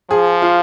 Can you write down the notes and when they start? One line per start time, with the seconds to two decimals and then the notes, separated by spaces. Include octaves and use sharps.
0.11 F3 G#4
0.42 F4